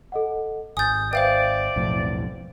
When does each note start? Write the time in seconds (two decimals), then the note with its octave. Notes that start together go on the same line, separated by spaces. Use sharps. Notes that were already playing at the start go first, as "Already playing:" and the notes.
0.12 A4 D#5 F#5
0.77 G#1 G#5 D#6 G6 A6
1.13 B4 C5 D5 E5 F5 G5 G6
1.76 B1 F2 A2